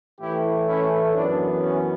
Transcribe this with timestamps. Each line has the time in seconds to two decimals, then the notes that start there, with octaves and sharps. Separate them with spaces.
0.21 A2 E3 A3 E4 G4
0.68 C#4 E4
1.14 F#2 E3 B3 D4
1.62 C#4